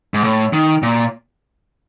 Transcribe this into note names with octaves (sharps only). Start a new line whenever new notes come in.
G#2
A2
D#3
A#2